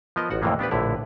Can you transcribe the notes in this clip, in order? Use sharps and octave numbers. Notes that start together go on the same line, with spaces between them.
F3 B3 A#4 D#5
A1 F#4 F#5
F2 A2 C3 E3 A#3 B3
B3 D4 G4 B4
A#1 A2 D3 E4 C#5 F#5